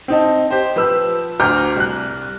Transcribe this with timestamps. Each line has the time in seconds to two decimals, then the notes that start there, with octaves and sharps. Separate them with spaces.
0.08 C4 D#4 A5
0.51 G4 C5
0.76 F3 B4 E6
1.40 D2 A#5 D6 F6 G6
1.76 C2 F#6